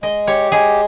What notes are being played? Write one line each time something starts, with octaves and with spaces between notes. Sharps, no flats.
G#3 D#5
G4 C#5
G#3 G#4